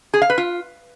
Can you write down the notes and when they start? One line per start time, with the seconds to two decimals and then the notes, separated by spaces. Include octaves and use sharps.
0.14 G#4
0.22 F5
0.30 B4
0.38 F4